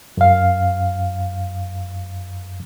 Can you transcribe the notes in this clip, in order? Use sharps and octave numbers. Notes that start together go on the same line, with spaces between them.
F#2 F5